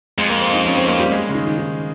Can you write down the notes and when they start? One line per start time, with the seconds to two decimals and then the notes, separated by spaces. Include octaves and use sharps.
0.18 F2 G#3
0.30 A#3
0.41 C4
0.53 D#4
0.65 C#4
0.77 C4
0.88 A#3
0.99 G3
1.12 G#3
1.29 C#3
1.35 D#3
1.47 D#3
1.58 D#3